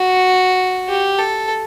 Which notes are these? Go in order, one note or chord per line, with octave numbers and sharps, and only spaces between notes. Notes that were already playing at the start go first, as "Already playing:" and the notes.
Already playing: F#4
G4
A4